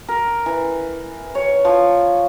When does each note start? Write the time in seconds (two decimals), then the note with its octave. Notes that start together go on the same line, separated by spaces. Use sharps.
0.08 A#4
0.46 E3
1.35 C#5
1.65 F3